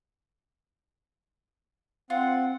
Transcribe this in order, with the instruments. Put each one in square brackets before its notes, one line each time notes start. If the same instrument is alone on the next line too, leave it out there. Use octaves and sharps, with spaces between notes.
[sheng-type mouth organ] C4 F#5 [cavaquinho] F4